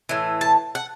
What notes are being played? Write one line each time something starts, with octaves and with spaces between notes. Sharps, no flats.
A2 E3
A5
F#5